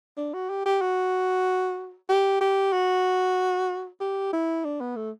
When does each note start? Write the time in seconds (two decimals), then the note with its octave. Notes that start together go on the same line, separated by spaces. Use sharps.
0.17 D4
0.34 F#4
0.49 G4
0.66 G4
0.81 F#4
2.09 G4
2.41 G4
2.73 F#4
4.00 G4
4.33 E4
4.65 D4
4.81 B3
4.96 A3